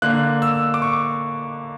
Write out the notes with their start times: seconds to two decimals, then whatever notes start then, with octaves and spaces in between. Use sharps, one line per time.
0.02 D3 A#3 F#6
0.42 E6
0.74 D6
0.82 C#6